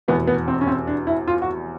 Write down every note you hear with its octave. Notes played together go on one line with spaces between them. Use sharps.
F1 E2 B2 B3
B3
C4
C#4
C4
D4
E4
F4
F#4